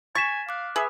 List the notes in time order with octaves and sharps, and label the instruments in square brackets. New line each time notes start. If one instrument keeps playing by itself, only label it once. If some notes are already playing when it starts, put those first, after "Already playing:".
[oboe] G#5 [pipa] C#6 [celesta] A6 B6 E7
[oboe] F5 [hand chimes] D6 F#6
[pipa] G#4 [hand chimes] B4 B5 D#6 [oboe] E5